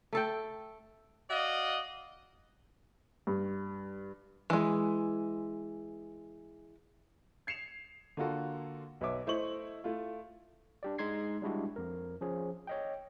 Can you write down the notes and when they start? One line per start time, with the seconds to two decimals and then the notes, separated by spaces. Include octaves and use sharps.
0.13 A3 A4 G5
1.30 F#4 D5 D#5 F5
3.27 G2
4.50 E3 G#3
7.47 G#6 C7 C#7 E7 F7
8.17 D3 A#3 F4 F#4 A4
9.01 B1 B4 C#5 E5 D6
9.27 A3 E4 C5 D#5 C#6 F#7
9.84 A3 E4 F4
10.83 D4 G4 D5
10.98 G#3 D#4 C6 G#6 C7
11.42 G3 G#3 D4 E4 F#4 G4
11.76 F2 A#4
12.21 F3 C#4 G#4
12.67 C#5 D#5 G5